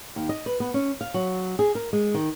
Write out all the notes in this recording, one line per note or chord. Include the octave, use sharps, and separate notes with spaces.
D#2
D#5
B4
B3
C#4
F5
F#3
G#4
A#4
G#3
D#3